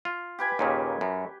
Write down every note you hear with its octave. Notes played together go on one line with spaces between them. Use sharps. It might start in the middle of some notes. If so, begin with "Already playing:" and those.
F4
G4 B4 G#5
D#2 A#2 C#3
F#2